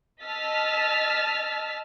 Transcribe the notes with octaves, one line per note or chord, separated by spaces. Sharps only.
D#5 A5 E6 F6 A6 B6